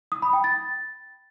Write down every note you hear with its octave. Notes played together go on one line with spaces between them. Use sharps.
D#6
B5
G5
A6